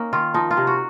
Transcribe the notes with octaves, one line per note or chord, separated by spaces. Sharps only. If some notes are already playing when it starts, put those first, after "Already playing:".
Already playing: A#3 C#4 D#4
D#3 F4
F3 D#4
F4
C3
F#4